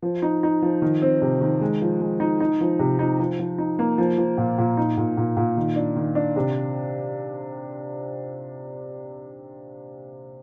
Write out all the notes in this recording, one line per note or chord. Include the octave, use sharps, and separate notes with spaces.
F3
D#4
D#4
F3
D#3
C4
C3
D#3
G#3
F3
G#3
D#4
D#4
F3
C3
D#4
F3
F3
D#4
A#3
F3
F3
A#2
A#2
D#4
A#2
A#2
A#2
D#3
D4
D#3
D4
C3